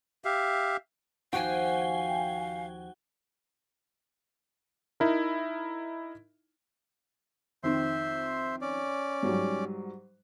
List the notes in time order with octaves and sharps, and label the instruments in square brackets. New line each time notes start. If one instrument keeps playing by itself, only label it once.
[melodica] G4 E5 F5
[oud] D#2 F3 [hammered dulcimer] F#4 [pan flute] F5 [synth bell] G5 G#5
[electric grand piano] D#4 E4 A#4
[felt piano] F2 D#3 C4 [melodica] C5 E5 C6
[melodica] C#4 D5
[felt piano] G#2 F#3 G3